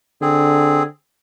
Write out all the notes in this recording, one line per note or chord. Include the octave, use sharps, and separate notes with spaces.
D3 C4 G#4